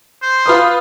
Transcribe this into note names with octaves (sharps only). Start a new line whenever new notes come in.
C5
F4 B4 D#6